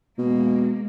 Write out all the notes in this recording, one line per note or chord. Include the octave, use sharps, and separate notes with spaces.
B2 G#3 A#3